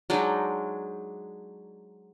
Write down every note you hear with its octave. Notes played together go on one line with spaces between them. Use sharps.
F#3 G#3 D4 D#4